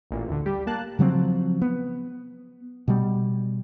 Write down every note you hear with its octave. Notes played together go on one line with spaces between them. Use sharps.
A1 A#2
D2 D3
G3 G4
A#3 A5 F#6
C#3 F3 F#3 C4
B3
B2 G3